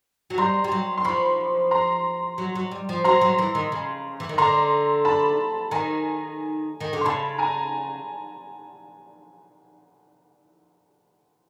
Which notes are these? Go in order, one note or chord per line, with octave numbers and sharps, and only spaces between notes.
F#3
G3 A#5 C6
G3
F#3
C6
F3 B5 C#6
A#5 C6
F#3
F#3
G3
F3
F#3 A#5 C6
F#3
E3
D#3
C#3
E3
D#3
D3 A#5 C6
A5 B5
D#3 G#5 A#5
D#3
D3
C6
C#3 A5 B5
G#5 A#5